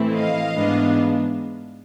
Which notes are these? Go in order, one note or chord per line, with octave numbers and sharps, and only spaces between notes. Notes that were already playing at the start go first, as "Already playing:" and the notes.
Already playing: A2 E3 A3 C4 E4
D#5 F5
G#2 E3 G#3 B3 D4